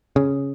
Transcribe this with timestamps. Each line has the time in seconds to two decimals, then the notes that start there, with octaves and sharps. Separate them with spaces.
0.16 C#3